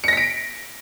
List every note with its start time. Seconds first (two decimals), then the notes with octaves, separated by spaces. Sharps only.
0.04 C#7
0.08 A#6
0.13 B6
0.17 D7